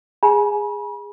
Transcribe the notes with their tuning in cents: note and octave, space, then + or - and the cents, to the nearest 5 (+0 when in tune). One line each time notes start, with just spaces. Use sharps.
G#4 -15 G#5 +25 B5 -40